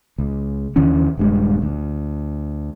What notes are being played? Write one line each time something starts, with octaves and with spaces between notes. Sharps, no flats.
C#2
D#2 D3 E3 C#4
D#1 G2 G#3
D2